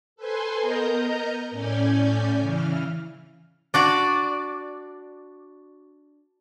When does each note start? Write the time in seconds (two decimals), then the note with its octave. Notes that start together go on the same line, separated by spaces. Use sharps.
0.16 A4 B4 C5 G#5 C6
0.59 B3 A#4 D#5 A#5 G6
1.51 A2 C#4 D5 G#5 G6
2.39 C#3 E3 F6
3.74 D4 F#4 D5